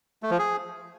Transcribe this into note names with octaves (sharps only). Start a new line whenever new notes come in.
A3
F3
G#4